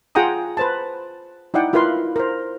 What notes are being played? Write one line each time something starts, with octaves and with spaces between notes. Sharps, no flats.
F4 G#4 F#5 G5 A#5 D#6
B4 C5 A5
D#4 E4 D5 F#5 G5
E4 F4 A#4 B4 F5 C6
A#4 C5